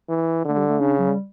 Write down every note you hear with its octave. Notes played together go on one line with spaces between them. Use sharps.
E3
D3 A3
G3
A3
C#3 D4
F#3
G3